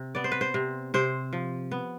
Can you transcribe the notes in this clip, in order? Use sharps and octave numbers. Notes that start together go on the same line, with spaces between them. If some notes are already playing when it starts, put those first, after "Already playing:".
Already playing: C3
B3 D5
C5
B4
C5
C3
C3 C5
F3
B3